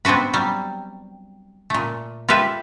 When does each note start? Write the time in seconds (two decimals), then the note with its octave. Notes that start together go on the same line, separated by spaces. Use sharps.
0.05 B3 C4 D4 F#4 B4
0.33 F#3 G3
1.70 A#2 A3
2.29 F4 G4 A4 B4 E5